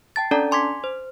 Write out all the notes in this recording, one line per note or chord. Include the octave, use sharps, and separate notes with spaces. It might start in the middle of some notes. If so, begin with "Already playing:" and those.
G5 A5 A6
C#4 D4 A4 D5 A5 A#5
G#5 C6 D6 G#6 B6
C5